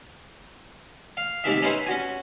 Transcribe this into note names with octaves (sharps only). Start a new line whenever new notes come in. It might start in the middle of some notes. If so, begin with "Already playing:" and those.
F5
G#2 C3 D#3 E5
C#4 D#4 E4 B4 C5 G#5
C#4 F#4 G#5